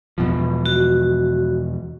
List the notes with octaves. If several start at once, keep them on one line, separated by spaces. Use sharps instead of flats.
E2 B2 F3
F#4